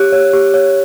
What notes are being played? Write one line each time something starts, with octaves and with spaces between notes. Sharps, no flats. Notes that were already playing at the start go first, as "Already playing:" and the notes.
Already playing: G4 C#5 F#6
C#5
G4
C#5